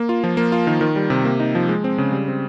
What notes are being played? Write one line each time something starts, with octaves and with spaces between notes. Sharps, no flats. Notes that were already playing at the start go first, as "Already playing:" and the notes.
Already playing: A#3
F4
F3
A#3
F4
D#3
D#3
G3
C3
A#3
D#4
F3
G#3
C4
C#3
G3
C4